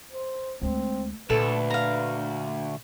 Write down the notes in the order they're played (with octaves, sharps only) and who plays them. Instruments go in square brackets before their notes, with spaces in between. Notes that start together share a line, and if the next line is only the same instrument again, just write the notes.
[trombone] C5
[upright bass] D2 G#3 [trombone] C4
[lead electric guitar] D2 [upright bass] A#2 [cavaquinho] A4 [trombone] B4
[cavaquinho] F5 A#5